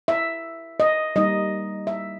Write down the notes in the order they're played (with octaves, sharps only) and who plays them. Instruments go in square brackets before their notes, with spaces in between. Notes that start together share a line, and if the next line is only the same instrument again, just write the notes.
[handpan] E5
D#5
G3 A#3 D#4 D#5
E5